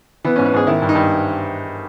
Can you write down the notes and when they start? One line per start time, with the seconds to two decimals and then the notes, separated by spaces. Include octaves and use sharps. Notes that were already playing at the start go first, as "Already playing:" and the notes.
0.25 E3 B3
0.36 G#2 C#4
0.46 B4
0.53 G#2 G#4
0.67 D#3 E4
0.82 G2
0.89 D#4
0.95 G2